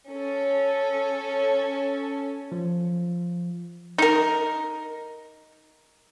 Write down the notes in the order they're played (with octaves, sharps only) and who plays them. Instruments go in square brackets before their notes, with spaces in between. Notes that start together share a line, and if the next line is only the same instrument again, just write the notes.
[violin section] C#4 A4
[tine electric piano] F3
[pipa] D#4 A#4